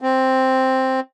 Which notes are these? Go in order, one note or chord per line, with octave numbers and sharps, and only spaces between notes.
C4